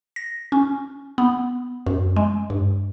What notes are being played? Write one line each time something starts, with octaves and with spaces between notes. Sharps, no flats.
A#6
C#4
B3
F#2
G#3
G2